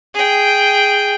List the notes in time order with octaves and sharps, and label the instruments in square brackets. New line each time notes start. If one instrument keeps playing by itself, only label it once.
[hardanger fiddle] G#4 G5